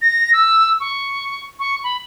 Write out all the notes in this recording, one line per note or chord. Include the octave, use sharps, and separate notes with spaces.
A#6
E6
C#6
C#6
B5